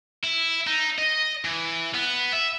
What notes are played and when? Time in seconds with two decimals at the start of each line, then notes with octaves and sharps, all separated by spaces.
0.23 E4
0.67 D#4
0.99 D#5
1.45 E3
1.94 B3
2.33 E5